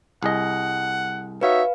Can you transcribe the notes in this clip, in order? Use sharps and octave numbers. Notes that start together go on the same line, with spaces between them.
C2 G#4 D#5 F#5
D#4 F#4 B4 C#5 E5 F5